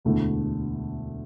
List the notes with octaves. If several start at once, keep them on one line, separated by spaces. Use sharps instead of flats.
E1 D2 D3 A3 E4